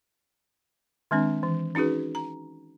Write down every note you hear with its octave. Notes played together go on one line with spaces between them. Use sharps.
D#3 G#3 C4 D4
E3
C#4 D#4 F#4 G#4 B4
A#5